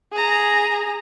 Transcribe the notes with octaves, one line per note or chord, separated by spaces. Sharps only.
G#4 A#5